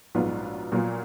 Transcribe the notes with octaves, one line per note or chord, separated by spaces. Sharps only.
A#1 G#2 F#3 B3 F4
A#2 F#3 B3 F4